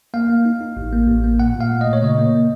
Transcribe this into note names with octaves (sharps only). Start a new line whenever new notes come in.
A#3 F5
A#3
D#4
D#4
A1
A#3
A1
A#3
A#2 F#5
A#2
F5
A3
D#5
A#2
C#5
C#3 D#5
A#3
A#3